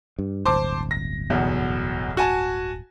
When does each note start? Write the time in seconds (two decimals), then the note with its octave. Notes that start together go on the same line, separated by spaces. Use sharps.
0.19 G2
0.45 D1 G1 C5 A5 D6
0.91 A#6
1.30 B1 E2 B2
2.17 F#4 G#5 A5